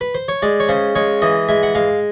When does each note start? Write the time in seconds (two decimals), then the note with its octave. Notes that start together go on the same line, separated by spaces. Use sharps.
0.01 B4
0.15 C5
0.28 C#5
0.42 G#3 D5
0.60 C#5
0.69 C#3 C5
0.95 G#3 C#5
1.22 E3 D#5
1.49 G#3 E5
1.63 F#5
1.75 G#3 F5